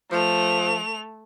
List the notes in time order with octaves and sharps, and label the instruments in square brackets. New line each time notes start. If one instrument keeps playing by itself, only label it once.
[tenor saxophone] F3 [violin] A3 F7